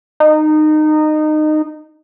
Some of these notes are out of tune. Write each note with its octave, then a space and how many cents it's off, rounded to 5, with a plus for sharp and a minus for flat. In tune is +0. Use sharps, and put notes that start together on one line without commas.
D#4 -20